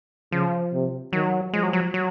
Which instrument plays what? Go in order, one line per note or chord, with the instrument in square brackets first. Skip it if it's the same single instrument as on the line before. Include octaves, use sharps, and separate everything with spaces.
[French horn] C#3 [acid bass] F3
[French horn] C3
[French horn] D#3 [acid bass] F#3
[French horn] F3 [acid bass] G#3
[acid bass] F#3
F#3
F#3